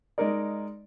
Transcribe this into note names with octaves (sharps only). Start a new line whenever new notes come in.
G#3 D#4 A#4 D5